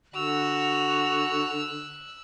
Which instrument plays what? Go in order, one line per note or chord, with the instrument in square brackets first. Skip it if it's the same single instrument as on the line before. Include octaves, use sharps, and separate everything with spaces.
[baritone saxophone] D3 [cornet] F#4 [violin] E6 F#6 [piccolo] F7